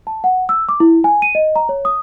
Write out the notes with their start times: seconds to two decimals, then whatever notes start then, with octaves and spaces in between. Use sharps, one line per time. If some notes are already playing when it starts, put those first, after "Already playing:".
0.07 A5
0.24 F#5
0.49 E6
0.69 D6
0.80 E4
1.04 G#5
1.22 D#7
1.35 D#5
1.56 A#5
1.69 C#5
1.85 D#6